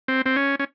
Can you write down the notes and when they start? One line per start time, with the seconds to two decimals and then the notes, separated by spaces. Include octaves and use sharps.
0.08 C4
0.26 C4
0.36 C#4
0.59 C#4